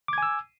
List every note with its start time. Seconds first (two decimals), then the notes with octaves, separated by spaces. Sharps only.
0.08 D6
0.13 G#6
0.18 G#5
0.22 E6